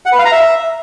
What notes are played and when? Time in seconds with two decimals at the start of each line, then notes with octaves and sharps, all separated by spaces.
0.06 F#5
0.12 B4
0.19 F5
0.25 A#5
0.32 E5